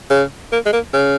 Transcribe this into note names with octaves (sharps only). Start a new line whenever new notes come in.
C#3
A#3
G#3
A#3
C#3